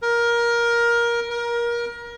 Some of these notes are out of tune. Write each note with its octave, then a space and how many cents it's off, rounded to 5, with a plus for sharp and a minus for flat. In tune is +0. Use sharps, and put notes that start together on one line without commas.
A#4 +15
A#4 +25